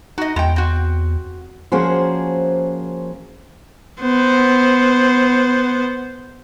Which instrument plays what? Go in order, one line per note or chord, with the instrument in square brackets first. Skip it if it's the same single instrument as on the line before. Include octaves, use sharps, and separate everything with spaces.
[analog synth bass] D#4 [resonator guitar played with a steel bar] F#4 D#5
[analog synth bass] E2 [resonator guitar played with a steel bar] G#3 G5
[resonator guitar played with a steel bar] C4 F#4
[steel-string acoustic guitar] F3 A#3 C#4 F#4 G#4 C5
[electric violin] B3 C5